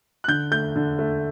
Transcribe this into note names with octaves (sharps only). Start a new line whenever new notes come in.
F#6
D3 G6
A3 G6
D3
A3